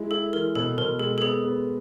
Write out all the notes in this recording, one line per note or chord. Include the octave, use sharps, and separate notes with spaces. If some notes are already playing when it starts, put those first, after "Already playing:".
Already playing: G#3 E4
E4 A4
E3 A#4
B2 A4
B2 A#4
G#3 A4
A4
B3 G#4
B3